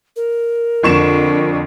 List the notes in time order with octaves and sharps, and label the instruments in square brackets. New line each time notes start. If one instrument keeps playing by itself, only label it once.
[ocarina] A#4
[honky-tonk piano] F2 C#6 E7 [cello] D3